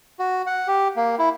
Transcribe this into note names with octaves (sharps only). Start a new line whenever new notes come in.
F#4
F#5
G4
A#3
E4